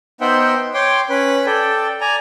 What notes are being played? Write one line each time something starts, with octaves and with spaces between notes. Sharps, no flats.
B3 D#4 C5 E5 F#5 G5
C#5 G5 C6 D6
C#4 B4
A4 D5 G5
D5 G#5 A#5